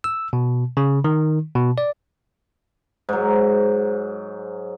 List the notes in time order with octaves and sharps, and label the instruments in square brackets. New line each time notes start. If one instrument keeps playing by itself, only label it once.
[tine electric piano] E6
B2
C#3
D#3
B2
D5
[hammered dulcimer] G#2 F#3